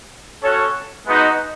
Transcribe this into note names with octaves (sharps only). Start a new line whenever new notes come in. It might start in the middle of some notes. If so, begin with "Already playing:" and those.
C#4 F#4 A4 C#5
G#3 B3 D#4 F#4